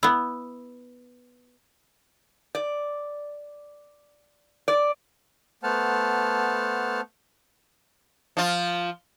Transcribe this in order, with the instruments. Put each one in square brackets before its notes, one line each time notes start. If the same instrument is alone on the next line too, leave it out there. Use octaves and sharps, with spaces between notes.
[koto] B3 E4
[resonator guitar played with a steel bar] D5
D5
[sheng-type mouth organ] A3 B3 C5 F#5 A5 F6
[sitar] F3 F4